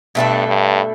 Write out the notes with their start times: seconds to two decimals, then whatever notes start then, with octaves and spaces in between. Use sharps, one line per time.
0.15 G2 B2 A3 D4 A4
0.47 G2